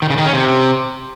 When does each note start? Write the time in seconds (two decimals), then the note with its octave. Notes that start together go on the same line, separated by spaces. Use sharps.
0.02 D#3
0.10 C#3
0.18 D#3
0.26 C#4
0.33 C3